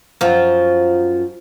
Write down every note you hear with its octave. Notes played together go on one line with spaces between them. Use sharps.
F#2 F3